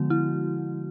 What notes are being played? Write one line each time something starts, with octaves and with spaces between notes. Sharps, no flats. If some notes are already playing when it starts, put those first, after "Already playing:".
Already playing: D3 F3 G#3 B3 F#4
E4